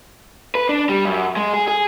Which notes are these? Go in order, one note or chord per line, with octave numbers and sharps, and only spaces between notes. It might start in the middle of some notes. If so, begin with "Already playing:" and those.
B4
D4
G3
F#2
G#3
G#4
G#4